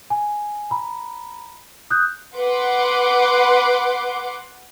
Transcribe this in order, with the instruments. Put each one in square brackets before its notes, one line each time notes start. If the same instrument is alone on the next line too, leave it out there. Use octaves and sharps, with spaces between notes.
[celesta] G#5
A#5 B5
D#6 F#6 G6
[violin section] B4 F#5 C6 D6